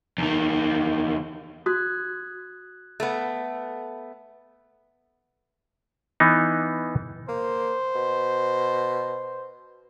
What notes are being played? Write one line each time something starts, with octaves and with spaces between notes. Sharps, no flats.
E2 D#3
F#4 D#6 F#6 G#6
A3 B3
E3 B3 D#4
A#3 C5
B2